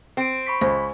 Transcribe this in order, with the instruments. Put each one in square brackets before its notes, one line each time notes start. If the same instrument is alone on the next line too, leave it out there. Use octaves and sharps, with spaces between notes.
[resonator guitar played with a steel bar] C4 [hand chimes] C7 D7
[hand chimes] B5 C#6 B6
[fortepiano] C#2 [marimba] C5 [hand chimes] G#5